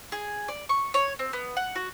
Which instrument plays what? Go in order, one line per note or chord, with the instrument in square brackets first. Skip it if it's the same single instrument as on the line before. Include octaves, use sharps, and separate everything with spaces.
[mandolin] G#4
D5
C#6
C#5
C4
B3
F#5
F#4